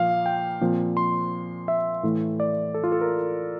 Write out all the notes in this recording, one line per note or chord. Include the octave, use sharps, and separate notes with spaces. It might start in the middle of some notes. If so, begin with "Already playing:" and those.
Already playing: A#2 F3 A#3 F5
G5
A#2 F3 C4
C6
E5
A2 E3 A3
D5
A4
F4
A4
A#4